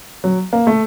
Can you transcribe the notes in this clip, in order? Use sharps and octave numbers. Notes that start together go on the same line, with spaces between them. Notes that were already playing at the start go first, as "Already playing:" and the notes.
F#3
A#3
A3